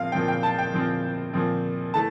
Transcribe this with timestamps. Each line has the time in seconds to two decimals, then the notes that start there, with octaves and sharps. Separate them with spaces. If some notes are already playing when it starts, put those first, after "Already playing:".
Already playing: A#2 F3 C4 F5
0.12 A#2 F3 C4 G5
0.28 G5
0.43 A5
0.58 G5
0.73 A#2 F3 C4
1.34 A#2 F3 C4
1.94 E3 A3 A5